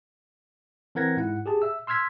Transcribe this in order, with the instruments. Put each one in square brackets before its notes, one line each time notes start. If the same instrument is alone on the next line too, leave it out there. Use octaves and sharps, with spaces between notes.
[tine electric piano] E3 C4 A#4 F#5 G#6 A#6
G#2 E4 F#5
G4 G#4 A5
E5 E6
C6 E6 F6 G#6 B6